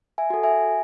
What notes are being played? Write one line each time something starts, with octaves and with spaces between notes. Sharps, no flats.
E5 G#5
F#4 A4
E5 G#5